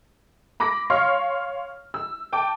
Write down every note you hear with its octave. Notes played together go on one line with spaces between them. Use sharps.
B5 D6 A#6
C#5 F5 C6 C#6 F6
E6
G5 A5 D6